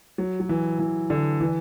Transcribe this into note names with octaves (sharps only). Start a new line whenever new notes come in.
F#3
F#3
E3
E3
D3
E3